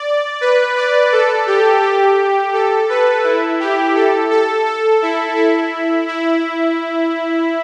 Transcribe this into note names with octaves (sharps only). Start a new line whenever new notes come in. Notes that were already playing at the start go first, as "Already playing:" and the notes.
Already playing: D5
B4
D5
A4
G4
G4
A4
B4
E4
G4
A4
A4
A4
E4
E4
E4